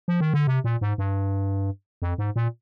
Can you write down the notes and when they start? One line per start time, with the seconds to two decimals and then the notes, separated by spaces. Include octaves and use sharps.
0.08 F3
0.20 D#3
0.34 D3
0.47 C3
0.64 A#2
0.81 G#2
0.98 G2
2.02 F2
2.18 G#2
2.36 A#2